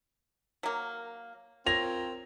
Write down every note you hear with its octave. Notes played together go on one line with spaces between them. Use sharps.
F#3 A#3
C4 F4 A#4 C#5 A#6 F7